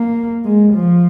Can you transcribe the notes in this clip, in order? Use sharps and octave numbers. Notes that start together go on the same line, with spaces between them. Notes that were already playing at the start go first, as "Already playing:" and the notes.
Already playing: A#3
G#3
F3